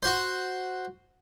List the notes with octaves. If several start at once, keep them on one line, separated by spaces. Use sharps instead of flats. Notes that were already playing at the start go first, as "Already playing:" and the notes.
F#4 C5